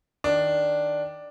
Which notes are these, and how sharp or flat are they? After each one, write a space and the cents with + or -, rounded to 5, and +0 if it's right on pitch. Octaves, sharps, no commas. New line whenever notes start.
D#3 +0 D4 +0